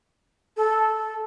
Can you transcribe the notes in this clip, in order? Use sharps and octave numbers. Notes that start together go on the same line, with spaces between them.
A4